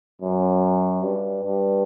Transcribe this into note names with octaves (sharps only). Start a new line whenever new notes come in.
F#2
G2
G2